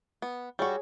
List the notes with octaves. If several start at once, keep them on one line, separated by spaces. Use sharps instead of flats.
B3
G3 F#4 G#4 C#5